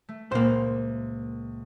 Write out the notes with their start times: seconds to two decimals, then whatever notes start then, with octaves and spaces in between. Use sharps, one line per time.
0.09 A3
0.32 C#2 A#2 A#3 C5 E7